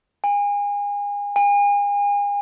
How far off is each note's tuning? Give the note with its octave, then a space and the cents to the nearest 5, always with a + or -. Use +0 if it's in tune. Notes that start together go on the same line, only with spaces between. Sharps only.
G#5 -30
G#5 -35